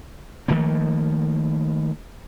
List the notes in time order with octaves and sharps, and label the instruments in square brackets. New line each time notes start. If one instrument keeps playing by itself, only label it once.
[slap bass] D#3 F3 A3 A#3